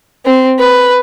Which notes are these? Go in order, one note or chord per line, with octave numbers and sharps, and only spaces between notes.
C4
B4